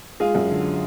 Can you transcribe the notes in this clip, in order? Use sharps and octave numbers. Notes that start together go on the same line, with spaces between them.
G#3 F4 G#4
F#2
D3